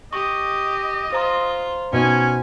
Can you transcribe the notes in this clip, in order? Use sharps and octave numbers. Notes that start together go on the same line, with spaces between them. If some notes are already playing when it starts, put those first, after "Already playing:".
G4 D#5 C#6
F4 C5 A#5 C6
B2 C#4 D#4 G#5